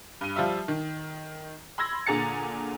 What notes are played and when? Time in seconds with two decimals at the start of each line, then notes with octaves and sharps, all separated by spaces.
0.21 G2 D#7
0.36 F3 G3 F4 E5
0.68 D#3
1.78 B5 C6 E6 G#6 A#6
2.06 A#2 D3 G#4 A#5 A6 C#7